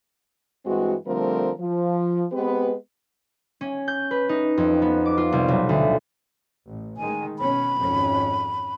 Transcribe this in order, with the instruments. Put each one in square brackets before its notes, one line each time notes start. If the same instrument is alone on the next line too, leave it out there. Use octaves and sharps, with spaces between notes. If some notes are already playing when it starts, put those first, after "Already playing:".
[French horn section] G2 E3 G#3 C4 F#4
D3 F3 G3 A3 C4 A#4
F3
G#3 B3 C4 G4 B4
[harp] C#4
G6
B4
D#4
F2
B3
D6
F4
C2
B1
D2
[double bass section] A1
[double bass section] D#3 G#3 [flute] G#5
[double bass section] B2 C#4 [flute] B5
[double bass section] G#1 F2 C#4